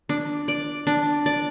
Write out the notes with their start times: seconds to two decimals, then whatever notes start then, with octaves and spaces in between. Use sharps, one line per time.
0.09 D4
0.48 D5
0.87 D4
1.26 D5